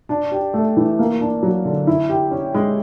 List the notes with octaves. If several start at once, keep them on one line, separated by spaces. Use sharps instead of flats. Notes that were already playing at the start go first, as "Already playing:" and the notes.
D4
G4
A3
E3
A#3
D4
F#3
D3
E4
G4
C#4
G#3